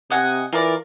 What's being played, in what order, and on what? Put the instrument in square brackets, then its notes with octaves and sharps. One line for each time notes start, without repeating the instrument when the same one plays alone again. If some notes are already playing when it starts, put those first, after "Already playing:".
[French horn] C3 [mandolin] D#5 F#5 G#5
[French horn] E3 [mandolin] F4 A#4 D5